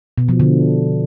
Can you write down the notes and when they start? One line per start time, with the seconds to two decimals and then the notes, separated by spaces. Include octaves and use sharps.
0.18 B2
0.29 F3
0.40 D3